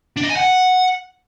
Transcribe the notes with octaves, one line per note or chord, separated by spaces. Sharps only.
D4
D#5
G#5
F#5